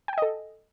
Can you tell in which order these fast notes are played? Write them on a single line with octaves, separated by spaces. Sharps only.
G5 G#5 D#5 A4